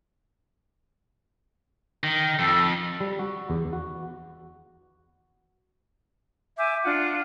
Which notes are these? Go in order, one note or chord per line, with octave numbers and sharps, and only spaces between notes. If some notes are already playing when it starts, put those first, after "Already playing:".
D#3
F2 A4
G3
F#4
E2
F#4
E5 G#5 D6 G6
D4 F4 F#5